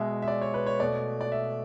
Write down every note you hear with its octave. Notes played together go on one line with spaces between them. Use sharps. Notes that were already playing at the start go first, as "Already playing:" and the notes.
Already playing: B2 G#3 E5
E5
D5
C#5
B4
C#5
B2 A3 D5
D5
E5